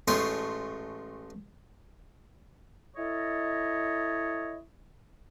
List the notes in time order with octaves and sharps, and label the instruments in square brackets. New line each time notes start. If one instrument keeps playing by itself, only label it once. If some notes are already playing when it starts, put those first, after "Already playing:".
[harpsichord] A1 G#3 A3 F4 C5 C#5
[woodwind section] E4 A4 C#5 D#5